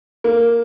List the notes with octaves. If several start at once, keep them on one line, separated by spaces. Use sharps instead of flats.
A#3